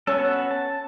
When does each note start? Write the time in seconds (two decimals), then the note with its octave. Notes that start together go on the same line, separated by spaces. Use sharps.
0.07 B3 C#4 F#4 A4
0.51 A5